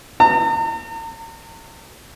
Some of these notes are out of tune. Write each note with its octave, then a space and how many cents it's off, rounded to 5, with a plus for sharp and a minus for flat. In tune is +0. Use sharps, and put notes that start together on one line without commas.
A#5 -45